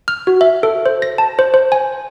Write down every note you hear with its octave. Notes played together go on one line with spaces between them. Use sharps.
F6
F#4
E5
A4
C5
A#6
A5
C5
C5
G#5